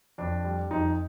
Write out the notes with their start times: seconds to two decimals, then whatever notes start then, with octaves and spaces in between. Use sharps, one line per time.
0.18 F2 D4
0.44 G3
0.71 F2 D#4